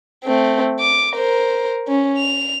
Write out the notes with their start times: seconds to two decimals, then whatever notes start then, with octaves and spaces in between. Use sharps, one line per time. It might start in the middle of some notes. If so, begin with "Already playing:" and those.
0.25 A3 C4
0.80 D6
1.14 A#4 C5
1.88 C#4
2.18 F7